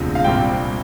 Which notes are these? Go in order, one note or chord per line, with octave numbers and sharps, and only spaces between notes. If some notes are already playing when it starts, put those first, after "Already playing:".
Already playing: E1 D2 C3 F3
F5
C2 A#2 G3 C4 G5